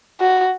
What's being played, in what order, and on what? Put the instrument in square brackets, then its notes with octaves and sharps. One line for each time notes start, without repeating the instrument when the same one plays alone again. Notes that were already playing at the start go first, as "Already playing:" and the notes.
[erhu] F#4